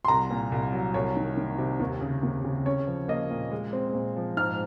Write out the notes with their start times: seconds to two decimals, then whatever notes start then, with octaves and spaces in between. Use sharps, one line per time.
0.05 C6
0.08 C2 A#5
0.31 A#2
0.52 C2
0.73 F#3
0.94 C2 C#5
1.17 D#3
1.37 D#3
1.58 C3
1.80 D#2
2.01 C#3
2.23 D#2
2.44 C#3
2.66 C#4 C#5
2.87 F3
3.08 A#3 D#5
3.31 A#2
3.52 G#3
3.73 C4
3.94 A#2
4.16 F3
4.37 G#2 F6